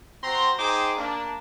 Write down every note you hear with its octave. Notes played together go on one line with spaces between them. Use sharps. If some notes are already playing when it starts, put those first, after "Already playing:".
C4 F#4 A#5 C6
D#4 G#4 C5 G5 D6
A#3 D4